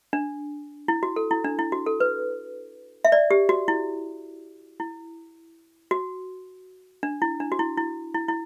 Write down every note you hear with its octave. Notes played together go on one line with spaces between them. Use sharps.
D4
E4
F#4
A4
E4
D4
E4
F#4
A4
B4
E5
D5
G4
F#4
E4
E4
F#4
D4
E4
D4
F#4
E4
E4
E4
E4